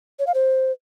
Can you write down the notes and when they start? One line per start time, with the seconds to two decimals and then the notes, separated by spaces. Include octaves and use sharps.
0.19 C#5
0.27 F5
0.34 C5